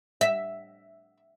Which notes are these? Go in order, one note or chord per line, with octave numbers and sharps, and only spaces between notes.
E5